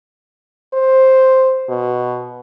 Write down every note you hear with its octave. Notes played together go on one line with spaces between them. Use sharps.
C5
B2